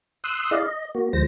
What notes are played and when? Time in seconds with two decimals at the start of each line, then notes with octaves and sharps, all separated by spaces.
0.24 C6 D#6 E6 F#6
0.51 E4 G#4 D5 D#5 F5
0.66 D#5
0.95 A#3 F#4
1.13 D2 F3 G#3 C5 A#6